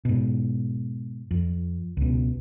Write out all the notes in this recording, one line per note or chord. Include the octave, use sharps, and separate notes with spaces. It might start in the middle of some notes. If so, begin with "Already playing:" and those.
G#2 B2
F2
C#2 B2